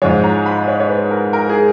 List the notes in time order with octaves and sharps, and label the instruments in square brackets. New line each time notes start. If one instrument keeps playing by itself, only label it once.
[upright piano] G#2 F3 G#3 [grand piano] C#5
[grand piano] A#5
B5
C#5
C#5
B4
A#4
A#4
G#4